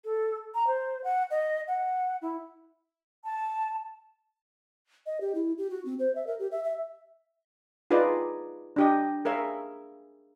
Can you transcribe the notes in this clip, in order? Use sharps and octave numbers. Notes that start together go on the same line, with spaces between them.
A4
A#5
C5
F#5
D#5
F#5
E4
A5
D#5
G4
E4
G4
F#4
C4
C5
E5
A#4
G4
E5
E5
D#4 F4 G#4 B4 D5 D#5
D4 G4 D#5
G#4 A#4 C#5 E5 F5